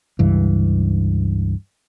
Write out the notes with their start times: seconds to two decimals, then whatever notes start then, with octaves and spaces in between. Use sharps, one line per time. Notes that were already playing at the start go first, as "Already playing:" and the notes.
0.19 C#2 G2 E3